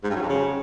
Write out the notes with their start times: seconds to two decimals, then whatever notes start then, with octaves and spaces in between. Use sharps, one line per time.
0.04 G#2
0.10 G2
0.16 F#3
0.23 F2
0.29 C#3